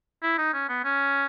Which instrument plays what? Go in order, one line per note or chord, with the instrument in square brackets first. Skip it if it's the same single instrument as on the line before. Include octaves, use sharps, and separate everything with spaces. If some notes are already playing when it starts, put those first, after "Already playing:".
[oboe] E4
D#4
C#4
B3
C#4